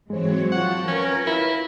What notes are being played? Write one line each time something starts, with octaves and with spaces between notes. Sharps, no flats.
G#2 E3 F#3 G#3 C4 C5 C#5
F3 F4 F#5 G5 A5 C#6
C#4 A#4 B4
E4 F4